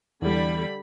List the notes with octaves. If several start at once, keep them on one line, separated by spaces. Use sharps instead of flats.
E2 D3 G3 B5